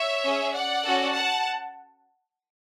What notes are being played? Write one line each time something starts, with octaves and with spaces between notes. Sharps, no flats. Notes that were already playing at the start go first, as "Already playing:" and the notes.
Already playing: C#5 E5
C#4 G#4
D5 F#5
C#4 F#4 A4
F#5 A5